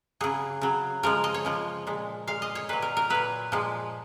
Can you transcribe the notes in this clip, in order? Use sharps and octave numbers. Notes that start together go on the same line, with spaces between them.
C#3 F#3 G#4
C#3 F#3
C#3 F3 G#3 A#4
D#5
C#5
C#3 F3 G#3
A#2 G#3
A#2 G#3 F5
D#5
C#5
A#2 F#3 B4
A#4
A#4
A#2 F#3 B4
A#2 F3 G#3